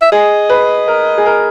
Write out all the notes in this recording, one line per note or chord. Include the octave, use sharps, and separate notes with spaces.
E5
G#4 D#5
B4
A#4
G#4
A#4